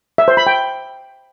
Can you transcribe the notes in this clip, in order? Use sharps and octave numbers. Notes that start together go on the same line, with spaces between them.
E5
C5
B5
G5